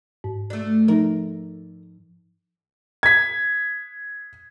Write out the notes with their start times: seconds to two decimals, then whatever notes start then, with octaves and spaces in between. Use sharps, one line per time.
0.24 G#2
0.50 A3 D4
0.88 F3 D#4 A#4
3.03 G#6 B6